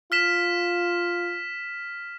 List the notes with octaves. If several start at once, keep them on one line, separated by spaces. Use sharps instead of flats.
F4 F6 B6 E7